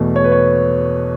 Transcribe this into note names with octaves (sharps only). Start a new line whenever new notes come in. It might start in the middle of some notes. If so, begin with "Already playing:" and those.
Already playing: E2 B2 A3
C#5
B4
C#5